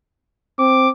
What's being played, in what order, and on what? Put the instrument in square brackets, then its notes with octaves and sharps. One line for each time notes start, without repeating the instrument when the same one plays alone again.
[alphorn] C4 [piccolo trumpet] D6